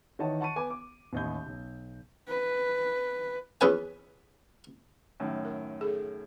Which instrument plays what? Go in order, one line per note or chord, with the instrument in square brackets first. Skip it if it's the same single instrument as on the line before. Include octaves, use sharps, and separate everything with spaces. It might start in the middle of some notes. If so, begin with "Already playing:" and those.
[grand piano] D#3 E3 C#5 D#5 F#5 A5
F#5 A5 C#6 D#7
B3 G#5 D6
D6
A1 D#2 D#5 G6
B1
[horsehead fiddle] B4
[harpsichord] E2 C#4 B4 G#5
[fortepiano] F#2 A2 D#3
[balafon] A#4
G#4 A4